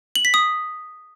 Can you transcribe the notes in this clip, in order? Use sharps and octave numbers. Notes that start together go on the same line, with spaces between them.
F#7
B6
D#6